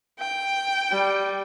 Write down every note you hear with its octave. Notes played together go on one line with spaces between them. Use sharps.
G5
G3